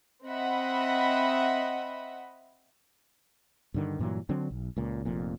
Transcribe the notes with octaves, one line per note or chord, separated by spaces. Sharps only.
C4 D#5 E5 F#5 B5
G2 D3 D#3
G2 A#2 E3 F#3
D3 F#3 C4 D4
B1
C#2 A#2
F1 F2 A#2